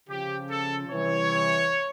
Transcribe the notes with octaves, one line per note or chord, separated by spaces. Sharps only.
C#3 F3 G4
A4
C3 E3 G3 C#5